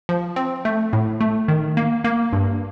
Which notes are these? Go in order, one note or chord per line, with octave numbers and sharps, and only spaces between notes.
F3
C4
A3
A2
A3
D#3
A#3
A#3
G2